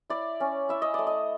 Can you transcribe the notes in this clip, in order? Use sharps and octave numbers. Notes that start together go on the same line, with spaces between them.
E4 D5
C#4
E4 E5
D#5
A3 D5
D#5